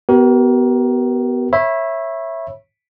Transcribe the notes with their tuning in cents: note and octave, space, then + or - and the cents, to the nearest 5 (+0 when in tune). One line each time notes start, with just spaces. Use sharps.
B3 +5 G4 -45 A#4 +25
C#5 -25 E5 +0 B5 -25